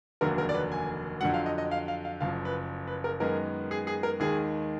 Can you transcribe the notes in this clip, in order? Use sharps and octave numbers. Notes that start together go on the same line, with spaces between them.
F1 D#2 D3 F#3 A#3 A#4
A#4
D5
B4
G#5
F2 D3 F#3 F#5
F5
D#5
D#5
F5
F5
F5
F#1 F#2 F3 F5
B4
B4
A#4
F#2 D#3 G#3 B3 A#4
G#4
G#4
A#4
D#2 D#3 G#3 G#4